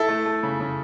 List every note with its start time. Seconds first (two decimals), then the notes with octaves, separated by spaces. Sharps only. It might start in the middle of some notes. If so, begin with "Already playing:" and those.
Already playing: E4 A4
0.09 A3
0.26 A3
0.43 C#3
0.60 C#3